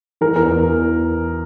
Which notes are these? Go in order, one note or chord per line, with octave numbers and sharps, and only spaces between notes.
E3 A#4
E2 A#4
E2